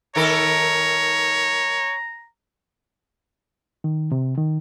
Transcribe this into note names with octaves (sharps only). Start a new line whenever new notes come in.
D#3 A4 A#4 C#5 A#5
D#3
C3
D#3